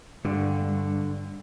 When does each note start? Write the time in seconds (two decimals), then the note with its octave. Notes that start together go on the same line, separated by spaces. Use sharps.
0.25 G2 D3